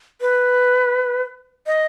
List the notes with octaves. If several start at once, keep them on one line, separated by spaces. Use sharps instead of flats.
B4
D#5